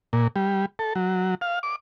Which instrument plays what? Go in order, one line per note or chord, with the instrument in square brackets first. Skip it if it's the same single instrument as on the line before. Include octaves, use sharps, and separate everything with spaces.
[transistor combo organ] A#2
G3
A4
F#3
F5
D6